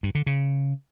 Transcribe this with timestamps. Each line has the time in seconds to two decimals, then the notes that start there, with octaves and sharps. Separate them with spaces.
0.03 G2
0.15 D3
0.26 C#3